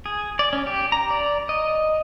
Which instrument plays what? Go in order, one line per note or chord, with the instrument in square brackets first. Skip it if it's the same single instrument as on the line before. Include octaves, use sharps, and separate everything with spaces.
[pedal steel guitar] G#4
D5
C#4
G4
A#5
D5
D#5